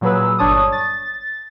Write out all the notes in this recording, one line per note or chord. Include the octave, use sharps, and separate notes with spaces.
A#2 F#3 G#4 B4 E6
G1 D4 C#5 A5 D#6
A6